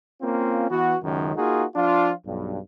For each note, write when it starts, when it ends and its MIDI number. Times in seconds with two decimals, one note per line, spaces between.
0.22 0.68 58
0.22 0.68 60
0.22 0.68 61
0.22 0.68 65
0.70 0.95 52
0.70 0.95 59
0.70 0.95 66
1.03 1.34 37
1.03 1.34 42
1.03 1.34 51
1.36 1.64 58
1.36 1.64 63
1.36 1.64 65
1.36 1.64 66
1.36 1.64 68
1.75 2.12 53
1.75 2.12 62
1.75 2.12 65
2.26 2.58 35
2.26 2.58 43